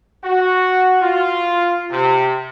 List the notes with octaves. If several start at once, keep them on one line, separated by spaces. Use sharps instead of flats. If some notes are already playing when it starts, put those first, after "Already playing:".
F#4
F4
C3